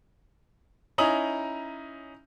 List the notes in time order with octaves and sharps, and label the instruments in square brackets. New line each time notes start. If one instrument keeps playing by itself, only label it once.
[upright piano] C#4 D#4 E4 A#5 D#6 F#7